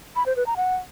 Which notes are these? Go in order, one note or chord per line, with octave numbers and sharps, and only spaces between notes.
B5
C5
B4
A#5
F#5